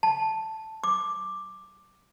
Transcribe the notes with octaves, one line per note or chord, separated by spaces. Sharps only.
A5
D6